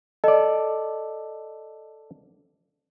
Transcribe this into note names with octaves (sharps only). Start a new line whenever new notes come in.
A4 D5 D#5